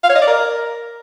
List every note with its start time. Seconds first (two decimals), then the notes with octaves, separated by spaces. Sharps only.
0.03 F5
0.09 C#5
0.16 D#5
0.22 D5
0.28 A#4